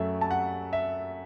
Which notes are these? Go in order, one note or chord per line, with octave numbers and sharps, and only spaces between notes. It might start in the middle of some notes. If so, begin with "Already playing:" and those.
Already playing: F#2 F#3 A3 E5
A5
F#5
E5